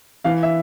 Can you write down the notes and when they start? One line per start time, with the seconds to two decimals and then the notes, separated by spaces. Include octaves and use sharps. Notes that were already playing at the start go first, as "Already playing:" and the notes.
0.24 E3 F5
0.43 E5